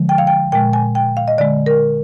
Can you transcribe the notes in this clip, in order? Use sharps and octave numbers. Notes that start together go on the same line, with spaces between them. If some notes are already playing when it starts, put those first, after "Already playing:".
Already playing: D3 F3 G#3
G5
F5
G5
A#2 G#3 G5
G#5
G5
F5
D#5
D3 G#3 D5
A#4